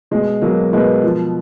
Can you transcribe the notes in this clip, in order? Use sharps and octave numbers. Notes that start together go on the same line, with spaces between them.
B2 G#3
B2 F#3 A#3
B2 G#3 B3
F3